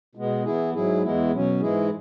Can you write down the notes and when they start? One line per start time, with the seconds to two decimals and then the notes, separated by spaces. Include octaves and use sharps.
0.15 B2 G#3 B3
0.44 E3 B3 E4 G#4
0.74 G#2 F#3 E4 G#4
1.02 E2 E3 G#3 B3 E4
1.31 B2 F#3 C#4
1.60 G#2 E3 G#3 E4 G#4